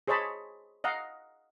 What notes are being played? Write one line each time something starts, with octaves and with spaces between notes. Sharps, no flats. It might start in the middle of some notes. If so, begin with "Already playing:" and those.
G#4 C5 C#5 D#5 A5 B5
D#5 F5 F#5 A#5